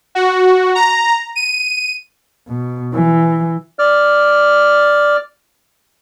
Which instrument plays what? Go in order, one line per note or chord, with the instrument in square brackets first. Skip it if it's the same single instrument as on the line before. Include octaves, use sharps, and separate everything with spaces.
[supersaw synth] F#4
A#5
D#7
[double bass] B2
E3
[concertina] D5 F6